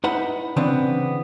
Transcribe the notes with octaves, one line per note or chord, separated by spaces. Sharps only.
D#4 E4 B4 F#5 B5
C#3 E3 B3 C4 D4